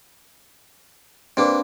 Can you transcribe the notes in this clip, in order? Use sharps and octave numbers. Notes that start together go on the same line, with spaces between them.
C3 A#3 D4 B4